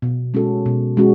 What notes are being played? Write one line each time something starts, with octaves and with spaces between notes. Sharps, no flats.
B2
G#3 C#4 F#4 A4
B2
G#3 C#4 F#4